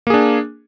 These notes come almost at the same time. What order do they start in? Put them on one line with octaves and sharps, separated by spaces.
A#3 G#4 D4